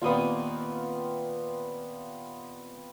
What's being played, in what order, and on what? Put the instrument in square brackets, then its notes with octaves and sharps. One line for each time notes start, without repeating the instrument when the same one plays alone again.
[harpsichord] D#2 A#2 D#6 [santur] B3 C4 F4